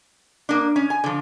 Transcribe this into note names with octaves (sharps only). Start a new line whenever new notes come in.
A#3 D4
C#4
G#5
D3 F3